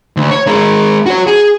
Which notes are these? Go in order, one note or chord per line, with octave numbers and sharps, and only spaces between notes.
D2
C#5
G#3 A#4
F#4 C#5
G#4